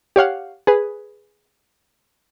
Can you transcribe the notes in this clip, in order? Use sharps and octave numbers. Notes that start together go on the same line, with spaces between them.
G4 C#5 F5 F#5
G#4 B4